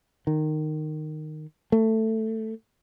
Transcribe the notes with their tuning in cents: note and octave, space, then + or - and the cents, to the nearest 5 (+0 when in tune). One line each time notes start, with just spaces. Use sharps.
D#3 -15
A3 +10